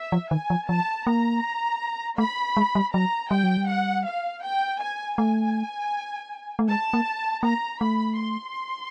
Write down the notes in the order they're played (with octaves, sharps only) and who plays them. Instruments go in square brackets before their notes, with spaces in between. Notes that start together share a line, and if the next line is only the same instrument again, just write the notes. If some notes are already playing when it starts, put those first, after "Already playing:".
Already playing: [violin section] E5
[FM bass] F3
[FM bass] D#3 [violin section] G#5
[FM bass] F3
[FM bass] F3 [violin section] A5
[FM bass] A#3 [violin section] A#5
[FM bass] A3 [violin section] B5
[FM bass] G#3
G3
[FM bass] F#3 [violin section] A#5
[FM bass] G3 [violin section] G5
[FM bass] F#3
G3
[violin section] F#5
F5
G5
G#5
[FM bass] A3 [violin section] G#5
[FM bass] A3
[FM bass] G#3 [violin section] A5
[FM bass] A#3
[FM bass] A#3 [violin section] A#5
[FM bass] A3 [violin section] B5
[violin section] C6